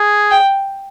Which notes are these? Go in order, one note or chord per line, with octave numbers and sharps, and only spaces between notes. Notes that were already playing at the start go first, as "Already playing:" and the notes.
Already playing: G#4
G5